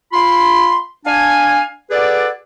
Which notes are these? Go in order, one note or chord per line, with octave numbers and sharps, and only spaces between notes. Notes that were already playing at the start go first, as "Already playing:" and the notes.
F4 B5 C6
D4 F5 G#5
F#4 G#4 A4 B4 D5